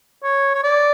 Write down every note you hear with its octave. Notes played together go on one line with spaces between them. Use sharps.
C#5
C#5
D5